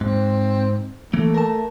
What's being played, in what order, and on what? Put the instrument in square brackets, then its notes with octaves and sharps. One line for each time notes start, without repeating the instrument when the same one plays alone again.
[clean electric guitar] G#2 [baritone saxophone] C4
[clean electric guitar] E3 A#3 [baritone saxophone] A3
[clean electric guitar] A#4 A5